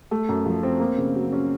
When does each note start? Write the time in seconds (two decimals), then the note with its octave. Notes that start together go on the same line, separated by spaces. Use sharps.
0.11 A3
0.29 F#2
0.46 F3
0.63 C4
0.80 A#3
0.97 C#3
1.15 F#3
1.32 C#4